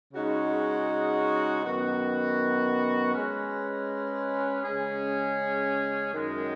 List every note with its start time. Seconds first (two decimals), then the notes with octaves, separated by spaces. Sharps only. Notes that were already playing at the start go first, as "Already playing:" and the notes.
0.14 C#3 G#3 D#4 F#4
1.64 F#2 D#3 B3 F#4
3.13 G#3 C#4 B4
4.63 C#3 G#3 C#4 G#4
6.12 F#2 D#3 G#3